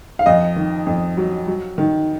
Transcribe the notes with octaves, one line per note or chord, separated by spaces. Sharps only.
F5
F2 D#5
D#3
F2
F#3
F#3
D#3